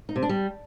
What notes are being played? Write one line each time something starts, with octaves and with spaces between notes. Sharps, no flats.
D#4
C3
D4
G3